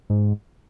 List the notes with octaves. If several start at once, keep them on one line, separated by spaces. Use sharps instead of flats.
G#2